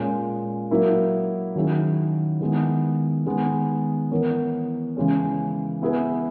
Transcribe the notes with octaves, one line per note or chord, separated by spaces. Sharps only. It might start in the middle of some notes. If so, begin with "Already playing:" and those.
Already playing: A#2 G#3 C#4
F#3 A#3 E4 A#4
D#3 F#3 C#4 E4 G#4
D#3 G#3 B3 E4
D#3 G#3 B3
E3 B3 E4 A#4 C#5
C#3 E3 G#3 C#4
B3 E4 G#4 B4